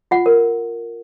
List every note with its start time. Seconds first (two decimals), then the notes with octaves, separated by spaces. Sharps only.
0.11 F4 F#5
0.26 A#4